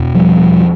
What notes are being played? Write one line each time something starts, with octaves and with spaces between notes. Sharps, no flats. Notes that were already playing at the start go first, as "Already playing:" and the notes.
Already playing: E2 B2
F3 G3